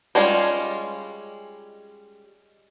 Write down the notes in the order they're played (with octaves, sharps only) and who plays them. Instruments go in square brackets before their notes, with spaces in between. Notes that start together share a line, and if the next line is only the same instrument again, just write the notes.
[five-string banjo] G3 G#3 C#4 F4